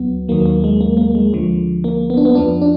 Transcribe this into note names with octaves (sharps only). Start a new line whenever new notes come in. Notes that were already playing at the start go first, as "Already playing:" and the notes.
Already playing: D2 F#3 B3
D#2 D#3 F#3 A#3
A#3
G#3
A#3
A#3
G#3
D2 D3 F3
A#3
B3
D4
B3
F2 F3 D4
D4